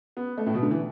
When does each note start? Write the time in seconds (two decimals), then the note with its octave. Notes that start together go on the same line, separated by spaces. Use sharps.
0.17 B3
0.38 A3
0.46 A2
0.54 B2
0.63 D3
0.71 E3